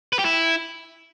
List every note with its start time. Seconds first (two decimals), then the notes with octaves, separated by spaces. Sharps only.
0.13 B4
0.19 G4
0.25 E4